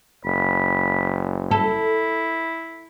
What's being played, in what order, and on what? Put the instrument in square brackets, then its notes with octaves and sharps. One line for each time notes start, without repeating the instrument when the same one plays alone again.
[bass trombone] F#1 [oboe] B5
[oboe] E4 [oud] A4